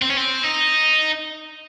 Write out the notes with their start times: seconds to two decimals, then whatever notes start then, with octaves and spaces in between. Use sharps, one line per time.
0.02 C4
0.10 C#4
0.17 C4
0.44 D#4